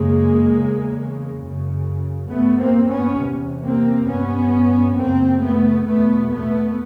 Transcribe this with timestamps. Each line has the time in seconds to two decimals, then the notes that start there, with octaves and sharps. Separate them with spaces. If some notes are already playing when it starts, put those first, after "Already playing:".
Already playing: F#2 C#3 G#3 A#3
0.53 E2 C#3
1.41 F#2 C#3
2.30 G2 A3 B3
2.60 A#3 C4
2.89 B3 C#4
3.19 E2 C3
3.63 A#3 C4
4.07 G2 B3 C#4
4.96 F#2 C#3 A#3 C4
5.41 A3 B3
5.85 E2 B2 A3 B3
6.30 A3 B3